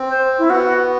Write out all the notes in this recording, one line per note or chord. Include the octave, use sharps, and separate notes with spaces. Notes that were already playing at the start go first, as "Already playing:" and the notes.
Already playing: C4
C5
E4
B3 F#4